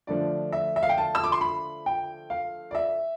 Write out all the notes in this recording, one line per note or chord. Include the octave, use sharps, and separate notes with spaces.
D3 F3 A3 D4 D5
E5
E5
F5
G5
A5
E6
D6
C6
B5
G5
F5
D5
E5